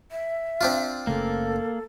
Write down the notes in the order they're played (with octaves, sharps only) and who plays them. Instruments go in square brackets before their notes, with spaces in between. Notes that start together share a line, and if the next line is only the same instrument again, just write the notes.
[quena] E5
[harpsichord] C4 D4 F4
[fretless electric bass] F#1 C#3 A3 [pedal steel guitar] A#3 [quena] A4